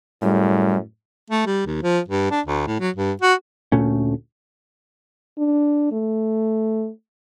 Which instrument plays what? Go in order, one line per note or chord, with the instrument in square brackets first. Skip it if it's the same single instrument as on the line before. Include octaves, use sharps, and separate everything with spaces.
[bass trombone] F#2 [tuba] A2 [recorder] G3
[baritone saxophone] A3
G3
D#2
F3
G2
D4
D2
A2
F#3
G2
F#4
[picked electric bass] D2 A#2 A3 C#4
[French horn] D4
A3